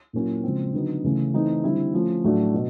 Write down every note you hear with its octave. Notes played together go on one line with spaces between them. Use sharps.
A#2 F#3 A#3 C#4 E4
C#3 F3 G#3 C4
D3 F#3 B3 D#4
C#3 E3 A3 C#4
E3 A3 C4 D#4
D3 G3 C4 E4
F3 A3 C#4
A2 F#3 A3 D4
B2